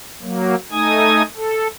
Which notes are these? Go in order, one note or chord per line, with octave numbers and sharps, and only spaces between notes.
F#3 A#3
A3 D#4 G#5 D#6 G#6
A4